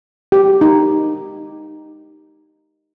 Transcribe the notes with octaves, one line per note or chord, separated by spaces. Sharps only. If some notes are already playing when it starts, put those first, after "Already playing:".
G4
D#4